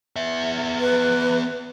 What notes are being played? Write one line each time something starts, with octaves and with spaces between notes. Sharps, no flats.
B3 E5
B4